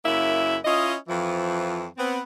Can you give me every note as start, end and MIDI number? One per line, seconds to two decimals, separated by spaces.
0.05 0.57 42
0.05 0.57 49
0.05 0.57 58
0.05 0.57 64
0.05 0.57 76
0.65 0.94 61
0.65 0.94 64
0.65 0.94 65
0.65 0.94 75
1.08 1.85 41
1.08 1.85 52
1.08 1.85 53
1.97 2.20 59
1.97 2.20 60